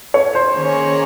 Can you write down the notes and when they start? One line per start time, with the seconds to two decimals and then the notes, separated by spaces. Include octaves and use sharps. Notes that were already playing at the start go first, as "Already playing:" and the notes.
0.14 C#5
0.35 C5
0.55 D#3 A#3 C#4 G#4 C#5